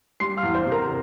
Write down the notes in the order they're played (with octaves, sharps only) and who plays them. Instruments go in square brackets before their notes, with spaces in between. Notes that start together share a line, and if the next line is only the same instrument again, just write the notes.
[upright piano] G3 C6 C7
F5 F6
E2
C5 C6
C3
A#4 A#5